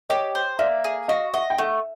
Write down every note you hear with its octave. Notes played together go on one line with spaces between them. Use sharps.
G4 C#5 D#5
C5
A#3 D5 E5
G#4
F#4 D#5 F5
D#5 E5 F#5
G5
A3 E5 F#5